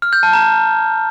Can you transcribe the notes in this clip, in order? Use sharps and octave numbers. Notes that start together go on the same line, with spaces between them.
F6
G6
A5
A#5